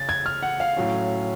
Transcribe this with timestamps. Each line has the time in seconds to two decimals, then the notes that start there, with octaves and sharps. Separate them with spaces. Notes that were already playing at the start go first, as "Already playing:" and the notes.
Already playing: C#3 A6
0.09 G#6
0.26 F6
0.43 F#5
0.60 F5
0.77 A2 F#3 C#4